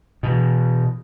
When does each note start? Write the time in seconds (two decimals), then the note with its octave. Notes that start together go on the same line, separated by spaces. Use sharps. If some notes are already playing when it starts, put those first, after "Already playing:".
0.23 B2 E3